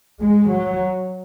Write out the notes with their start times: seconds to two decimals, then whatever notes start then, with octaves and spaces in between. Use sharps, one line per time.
0.21 G#3
0.50 F#3